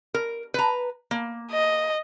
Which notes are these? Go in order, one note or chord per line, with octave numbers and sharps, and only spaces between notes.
A#4
B4 A#5
A#3
D#5